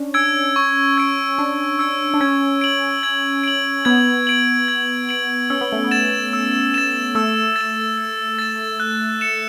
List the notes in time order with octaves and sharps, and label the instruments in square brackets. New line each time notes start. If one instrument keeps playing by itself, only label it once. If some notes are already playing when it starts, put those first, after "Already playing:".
Already playing: [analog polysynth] C#4 D4
[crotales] E6 G#6 D7
C#6
E6 G#6 D7
[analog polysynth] D4 [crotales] C#6
[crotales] E6 G#6 D7
[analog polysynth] D4
[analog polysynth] C#4 [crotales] G#6
[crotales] D7 F#7
G#6
D7 F#7
[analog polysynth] B3 [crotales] G#6
[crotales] D7 F#7
G#6
D7 F#7
[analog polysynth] C#4 [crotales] E6
[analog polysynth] B3
A3
B3
[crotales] A6 E7
E6
A6 E7
[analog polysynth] A3 [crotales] E6
[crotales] A6
E7
E6
A6 E7
F#6
C#7 E7